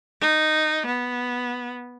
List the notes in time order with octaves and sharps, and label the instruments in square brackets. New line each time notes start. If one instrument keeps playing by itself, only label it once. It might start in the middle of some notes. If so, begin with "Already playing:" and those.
[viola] D#4
B3